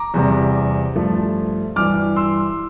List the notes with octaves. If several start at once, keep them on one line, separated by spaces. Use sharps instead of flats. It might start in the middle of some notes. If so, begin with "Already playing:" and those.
Already playing: A#5 D6
E2 C3 G3
G2 F3 A3
G2 E3 G3 D6 F6
C6 E6